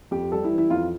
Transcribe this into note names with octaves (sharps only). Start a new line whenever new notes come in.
F2 G4
G3 A4
E4
E3
E4
F2 F4